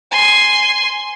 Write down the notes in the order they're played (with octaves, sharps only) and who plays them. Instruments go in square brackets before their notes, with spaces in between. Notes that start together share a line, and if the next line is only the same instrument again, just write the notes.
[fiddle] G#5 C6